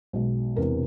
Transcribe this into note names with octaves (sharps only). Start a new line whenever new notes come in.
B1 B2 G#3
E1 E2 C3 A#4